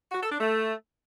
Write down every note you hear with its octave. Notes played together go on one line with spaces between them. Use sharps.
F#4
A4
D4
A3